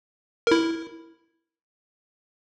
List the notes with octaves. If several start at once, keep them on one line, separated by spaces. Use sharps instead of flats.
E4 A#4